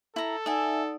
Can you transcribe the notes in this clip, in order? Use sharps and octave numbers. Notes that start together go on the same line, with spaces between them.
E4 A4 A#5
D#4 D5 E5 F#5 G#5